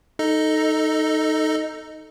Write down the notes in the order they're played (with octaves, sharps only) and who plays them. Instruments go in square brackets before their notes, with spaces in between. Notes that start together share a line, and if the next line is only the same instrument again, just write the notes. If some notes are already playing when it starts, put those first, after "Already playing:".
[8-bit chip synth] D#4 A4 D#5